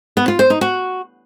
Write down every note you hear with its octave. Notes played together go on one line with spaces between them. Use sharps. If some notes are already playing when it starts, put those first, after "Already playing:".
B3
F4
C5
D#4
F#4